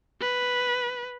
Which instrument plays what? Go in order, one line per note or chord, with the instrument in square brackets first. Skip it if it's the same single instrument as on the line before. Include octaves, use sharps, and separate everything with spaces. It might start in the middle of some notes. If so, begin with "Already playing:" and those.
[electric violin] B4